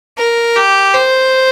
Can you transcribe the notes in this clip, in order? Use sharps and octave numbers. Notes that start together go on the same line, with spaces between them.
A#4
G4
C5